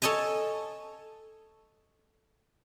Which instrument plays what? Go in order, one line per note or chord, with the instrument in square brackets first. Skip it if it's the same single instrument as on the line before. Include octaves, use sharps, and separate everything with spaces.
[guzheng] A4 C#5 D#5 G#5 A#5